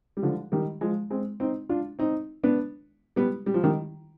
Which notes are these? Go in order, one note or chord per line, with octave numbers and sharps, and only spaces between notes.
G3
D3 F3
D#3 G3
F3 G#3
G#3 C4
C4 D#4
D4 F4
C4 D#4
B3 D4
G3 B3
G3
F3
D#3 G3